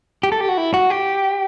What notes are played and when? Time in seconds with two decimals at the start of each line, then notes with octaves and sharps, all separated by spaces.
0.23 G4
0.32 A4
0.41 G4
0.49 F#4
0.57 E4
0.74 F#4
0.90 G4